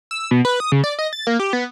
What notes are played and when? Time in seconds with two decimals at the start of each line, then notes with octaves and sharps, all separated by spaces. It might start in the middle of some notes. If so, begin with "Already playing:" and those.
0.11 E6
0.31 B2
0.45 B4
0.60 D#6
0.72 C#3
0.84 D5
0.99 D#5
1.13 A6
1.27 A#3
1.40 G4
1.53 B3